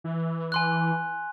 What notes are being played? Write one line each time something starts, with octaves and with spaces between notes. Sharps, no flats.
E3
G#5 C6 F#6